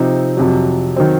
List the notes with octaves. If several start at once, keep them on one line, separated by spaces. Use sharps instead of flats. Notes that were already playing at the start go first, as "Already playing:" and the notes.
Already playing: C3 F3 C4 D#4
F2 C3 F#3
D#3 F#3 C4